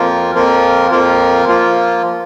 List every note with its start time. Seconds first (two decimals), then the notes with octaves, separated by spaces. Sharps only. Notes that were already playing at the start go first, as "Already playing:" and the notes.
Already playing: F2 F3 A#3 F4 A#4
0.35 F2 F3 A#3 F4 A#4
0.91 F2 F3 A#3 F4 A#4
1.47 F3 A#3 F4